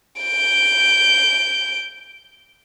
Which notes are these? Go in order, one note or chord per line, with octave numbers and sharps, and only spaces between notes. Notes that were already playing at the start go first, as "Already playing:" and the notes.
G6 D7